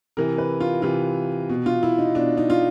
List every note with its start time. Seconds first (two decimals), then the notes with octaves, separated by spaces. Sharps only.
0.17 C3 E3 A#4
0.38 B4
0.60 F4
0.82 C3 E3 F4
1.49 B2
1.66 F4
1.83 E4
1.98 D#4
2.15 B2 D4
2.37 D#4
2.50 F4